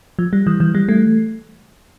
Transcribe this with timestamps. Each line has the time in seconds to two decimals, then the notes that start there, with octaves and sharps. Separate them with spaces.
0.19 F3
0.33 G3
0.47 E3
0.60 E3
0.75 G3
0.89 A3